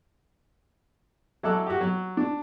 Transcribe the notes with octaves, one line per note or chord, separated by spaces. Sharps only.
F#3 E4 A4 D6 E6 F#6
F#4 G4
F#3
D4